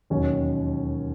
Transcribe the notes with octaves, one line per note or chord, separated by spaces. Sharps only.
E1 D#2 D#3 F#3 C#4